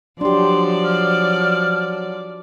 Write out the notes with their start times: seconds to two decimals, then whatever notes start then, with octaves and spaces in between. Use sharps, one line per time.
0.21 F3 F#3 D4 G4 D5 C6
0.85 F6